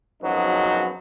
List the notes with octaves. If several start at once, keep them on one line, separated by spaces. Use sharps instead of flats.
G#1 F#2 F3 F#3 B3 D#4